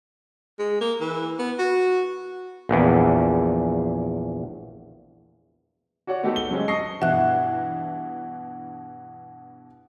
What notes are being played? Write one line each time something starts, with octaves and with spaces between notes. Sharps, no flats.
G#3
A#3
E3
B3
F#4
A#1 E2
F#4 C#5 D5 F#5
D#3 A3 B3 F#4 G4 A4
G7
C#3 F#3 G#3 C4 C#4 D#4
D#5 A5 C#6 D#6 A#6 C7
G2 B2 E3 E5 F#5 F#6